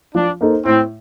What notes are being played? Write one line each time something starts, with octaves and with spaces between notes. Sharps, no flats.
F3 D4
A#3 D#4 A4 C5
A2 C4